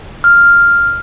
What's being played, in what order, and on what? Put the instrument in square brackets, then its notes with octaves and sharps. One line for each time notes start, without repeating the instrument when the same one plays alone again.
[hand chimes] F6